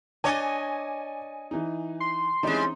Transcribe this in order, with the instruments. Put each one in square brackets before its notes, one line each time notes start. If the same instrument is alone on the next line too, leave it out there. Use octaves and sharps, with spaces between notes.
[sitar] D4 C#5 D#5 [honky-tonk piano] G#5 [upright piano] D6 A6
[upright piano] E3 D#4
[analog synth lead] C6
[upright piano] E3 C4 C#4 [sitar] G3 G#3 [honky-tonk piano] D#4